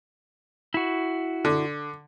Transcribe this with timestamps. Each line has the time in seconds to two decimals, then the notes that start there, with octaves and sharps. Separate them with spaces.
0.74 E4 F#4
1.45 D3